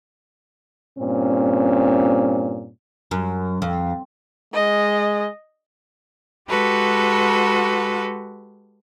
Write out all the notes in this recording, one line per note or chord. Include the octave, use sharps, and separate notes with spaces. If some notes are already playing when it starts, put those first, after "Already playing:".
G2 A#2 C4 C#4
F#2
F2
G#3 D#5
G#3 F#4 G4 A4 B4